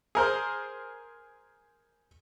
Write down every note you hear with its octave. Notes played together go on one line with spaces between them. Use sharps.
G#4 A#4 C5